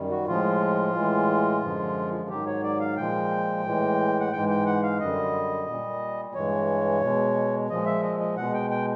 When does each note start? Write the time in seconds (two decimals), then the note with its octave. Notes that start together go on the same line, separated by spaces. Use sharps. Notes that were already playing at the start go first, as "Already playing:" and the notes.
Already playing: F#2 D#3 G3
0.10 F#4
0.27 A2 F3 G#3 F4
0.94 A2 E3 G#3
1.62 F#2 D3 F3 G#3
2.29 G#2 D#3 F#3 G4
2.46 C#5
2.63 D5
2.80 F5
2.97 A#2 F3 G#3 G5
3.64 A2 E3 G#3
4.20 F#5
4.32 G#2 E3 G#3 G5
4.49 G5
4.66 F#5
4.83 F5
4.99 F#2 D3 G3 D#5
5.67 A#2 G3
6.34 G2 E3 G#3 C#5
7.01 B2 G#3
7.69 A#2 F3 G#3 D#5
7.86 E5
8.02 D#5
8.20 D#5
8.37 B2 G#3 F#5
8.53 G5
8.71 G5